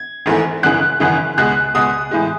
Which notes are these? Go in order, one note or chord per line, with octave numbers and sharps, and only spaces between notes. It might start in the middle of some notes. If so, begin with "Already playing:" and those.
Already playing: G#6
G#1 G#2 E3 A3
G#1 F#2 C#3 E3 F#6
G#1 F#2 C#3 E3
C#2 B2 G#3 F#6
C#2 B2 G#3 D#6
A2 E3 G#3